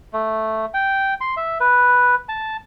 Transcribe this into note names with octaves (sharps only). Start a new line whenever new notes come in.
A3
G5
C6
E5
B4
A5